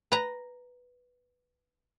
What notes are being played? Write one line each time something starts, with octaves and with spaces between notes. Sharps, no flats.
B4 A#5